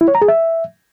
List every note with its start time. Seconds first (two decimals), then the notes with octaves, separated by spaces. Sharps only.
0.01 E4
0.08 C#5
0.15 A#5
0.22 G#4
0.28 E5